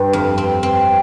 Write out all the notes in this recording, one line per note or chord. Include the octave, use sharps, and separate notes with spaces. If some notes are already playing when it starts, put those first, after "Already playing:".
Already playing: G2
F2
C4
C4